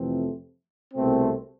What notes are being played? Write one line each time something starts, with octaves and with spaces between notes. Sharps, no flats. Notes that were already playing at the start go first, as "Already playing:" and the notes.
Already playing: F2 C3 E3 A3 C4
C2 B2 A3 C4